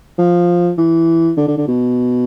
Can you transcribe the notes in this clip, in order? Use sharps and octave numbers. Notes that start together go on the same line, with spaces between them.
F3
E3
D3
D3
D3
B2